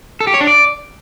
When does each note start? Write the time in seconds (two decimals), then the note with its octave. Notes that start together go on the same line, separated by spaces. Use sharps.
0.20 A4
0.27 G4
0.34 C#5
0.41 D4
0.47 D5